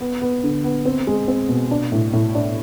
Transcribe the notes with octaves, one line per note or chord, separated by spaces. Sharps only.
B3
B3
D3
B3
C4
G#3
C4
B2
D4
A2
A2
D4